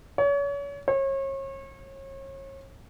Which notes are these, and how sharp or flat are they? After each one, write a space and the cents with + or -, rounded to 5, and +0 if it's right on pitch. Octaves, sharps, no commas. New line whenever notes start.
C#5 +35
C#5 -35